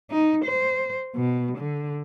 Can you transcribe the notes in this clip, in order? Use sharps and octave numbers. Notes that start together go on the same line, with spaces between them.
D#4
C5
B2
D3